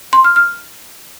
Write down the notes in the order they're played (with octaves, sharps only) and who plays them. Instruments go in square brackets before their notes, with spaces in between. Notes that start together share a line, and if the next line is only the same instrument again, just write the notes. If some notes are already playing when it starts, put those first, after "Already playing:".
[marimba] C6
F6
F6